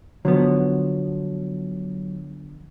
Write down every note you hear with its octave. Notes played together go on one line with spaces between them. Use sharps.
D3 F3 F#3 B3